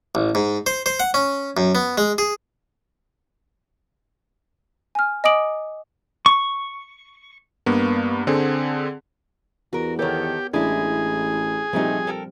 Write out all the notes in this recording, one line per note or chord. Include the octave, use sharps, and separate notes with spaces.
A1
G#2
C5
C5
F#5
C#4
F#2
B3
G#3
G#4
G#5 F6
D#5 G#5 D6 D#6 D7 F#7
C#6
G2 A#3 B3
D3 C4 G#4
E2 F#4 A#4
D#3 B3 G4 A4 A#4 C#5
A1 G#3 D4 E4 G#4
A#2 F3 G3 A3 C4 D#4
A4 A#4 G5